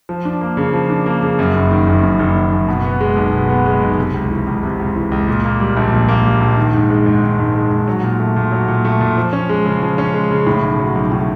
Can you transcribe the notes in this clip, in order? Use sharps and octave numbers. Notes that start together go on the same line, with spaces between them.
F3
D4
A#3
C#3
F3
D4
A#3
C#3
F#2
F#1
D#3
F#1
F#2
F#1
D#3
F#1
B2
B3
G#3
B1
B2
B3
G#3
B1
C3
C#2
E3
C#2
C3
C#2
E3
C#2
A#2
A#3
G3
A#1
A#2
A#3
G3
A#1
D#3
G#2
G#3
G#2
D#3
G#2
G#3
G#2
F#3
A#2
A3
A#2
F#3
A#2
A3
A#2
F3
C#4
G#3
C#3
F3
C#4
G#3
C#3
A2
B1
F#3
B1
A2